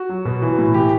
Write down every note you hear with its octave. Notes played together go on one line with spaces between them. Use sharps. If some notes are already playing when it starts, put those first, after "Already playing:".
Already playing: F#4
F#3
B2
E3
A2
E3 G4